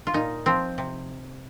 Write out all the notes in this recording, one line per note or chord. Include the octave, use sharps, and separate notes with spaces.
F4
A#2 D#4
F3 C4
C3